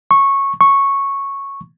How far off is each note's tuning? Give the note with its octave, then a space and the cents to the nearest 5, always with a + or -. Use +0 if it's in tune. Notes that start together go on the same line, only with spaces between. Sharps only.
C#6 -10
C#6 -5